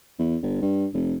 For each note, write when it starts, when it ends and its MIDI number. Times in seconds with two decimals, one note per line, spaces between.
0.19 0.37 40
0.42 0.57 31
0.62 0.87 43
0.94 1.16 29